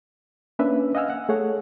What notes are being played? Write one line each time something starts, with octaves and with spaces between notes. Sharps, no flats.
A#3 C#4 D4 B4 E5
D#5 F5 F#5 G#5 E6 F6
F#5
A3 G#4 A4 C#5 F#5